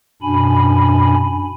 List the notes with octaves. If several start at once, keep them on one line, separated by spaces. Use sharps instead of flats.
F#2 B2 D4 G#5 B5